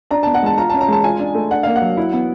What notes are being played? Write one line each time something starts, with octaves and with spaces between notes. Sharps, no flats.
D4 A#5
B3 A5
F#5
G#3 A5
F4 A#5
C#4 A5
A#5
G#3 A5
F4 G#5
D4
A3
D4 F#5
A#3 F5
F#5
F#3
E4
B3